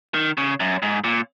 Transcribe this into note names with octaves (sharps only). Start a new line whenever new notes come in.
D#3
C#3
F#2
G#2
A#2